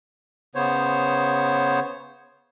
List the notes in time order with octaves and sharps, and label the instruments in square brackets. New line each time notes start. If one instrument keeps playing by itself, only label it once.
[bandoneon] C#3 B3 C5 C#5